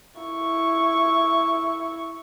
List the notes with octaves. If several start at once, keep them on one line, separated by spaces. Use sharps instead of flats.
E4 C#6